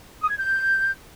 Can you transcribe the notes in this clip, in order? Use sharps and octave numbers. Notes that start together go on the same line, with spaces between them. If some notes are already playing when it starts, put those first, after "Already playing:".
D#6
G#6
G6